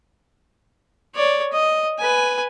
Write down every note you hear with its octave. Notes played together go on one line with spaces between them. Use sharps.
C#5 D5
D#5
B4 G#5